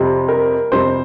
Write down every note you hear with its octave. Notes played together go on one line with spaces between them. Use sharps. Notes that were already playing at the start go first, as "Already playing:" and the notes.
Already playing: F2 C3 G3 C4
A#4
F2 C3 G3 C4 C5